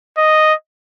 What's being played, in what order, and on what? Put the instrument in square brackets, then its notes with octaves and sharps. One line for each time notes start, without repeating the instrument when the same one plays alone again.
[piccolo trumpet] D#5